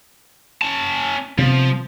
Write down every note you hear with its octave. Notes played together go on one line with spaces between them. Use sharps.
C#4 A5
C3 F3 B3